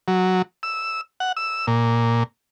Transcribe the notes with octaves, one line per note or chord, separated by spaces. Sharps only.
F#3
E6
F#5
E6
A#2